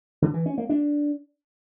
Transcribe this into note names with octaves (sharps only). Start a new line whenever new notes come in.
D3
E3
C#4
A#3
D4